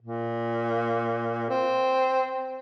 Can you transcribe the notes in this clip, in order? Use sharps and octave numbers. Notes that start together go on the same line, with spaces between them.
A#2
C4